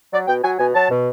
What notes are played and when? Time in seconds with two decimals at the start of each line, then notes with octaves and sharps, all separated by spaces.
0.13 F#3 D5
0.28 B2 G5
0.44 F#3 G#5
0.59 B2 G#5
0.74 F#3 A5
0.91 B2